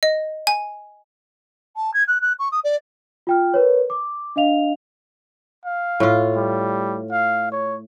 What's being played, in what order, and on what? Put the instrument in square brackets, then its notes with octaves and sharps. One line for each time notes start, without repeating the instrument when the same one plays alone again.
[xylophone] D#5
G#5
[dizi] A5
G#6
F#6
F#6
C#6
D#6
D5
[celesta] F4 G5 F6
A#4 B4 C#5
D6
D4 D#5 F5 F7
[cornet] F5
[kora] A2 F4
[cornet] G3
F5
C#5